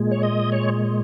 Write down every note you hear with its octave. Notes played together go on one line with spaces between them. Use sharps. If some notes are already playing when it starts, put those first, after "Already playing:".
Already playing: A#2 G#3
C#5
D#5
C#5